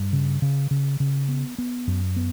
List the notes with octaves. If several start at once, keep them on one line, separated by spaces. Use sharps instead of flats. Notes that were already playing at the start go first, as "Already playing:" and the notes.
Already playing: G2
C#3
C#3
C#3
C#3
B3
B3
F#2
B3